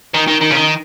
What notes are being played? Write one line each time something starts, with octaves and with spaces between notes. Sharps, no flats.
D#3
D#3
D#3
C#3
D#3